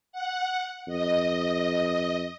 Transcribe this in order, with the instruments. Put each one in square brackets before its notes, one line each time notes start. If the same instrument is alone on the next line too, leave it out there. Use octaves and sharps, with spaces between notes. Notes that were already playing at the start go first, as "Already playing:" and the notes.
[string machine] F#5
[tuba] F2 [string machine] D#5